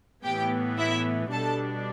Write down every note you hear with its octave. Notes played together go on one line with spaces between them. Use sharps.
A2 E3 B3 G4 G5
E4 E5
B2 G3 D4 A4 A5